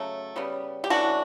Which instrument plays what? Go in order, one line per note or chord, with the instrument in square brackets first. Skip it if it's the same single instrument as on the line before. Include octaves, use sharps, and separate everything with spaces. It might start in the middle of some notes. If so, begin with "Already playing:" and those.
Already playing: [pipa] C#3 F#3 A3
C#3 G3 B3
G4
C#3 E3 A3 D4 F#4